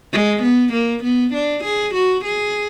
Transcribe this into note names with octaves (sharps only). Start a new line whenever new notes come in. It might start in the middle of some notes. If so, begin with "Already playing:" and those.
G#3
B3
A#3
B3
D4
G#4
F#4
G#4